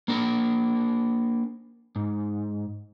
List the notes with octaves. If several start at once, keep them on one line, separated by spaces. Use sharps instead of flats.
A#3 D4 A#4
G#2